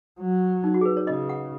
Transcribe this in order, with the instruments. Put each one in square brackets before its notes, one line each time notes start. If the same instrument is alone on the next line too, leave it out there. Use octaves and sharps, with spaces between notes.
[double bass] F#3
[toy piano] D#4
F#4
G#4
B4
C#5
[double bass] C#3 [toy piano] D#5
[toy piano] F#5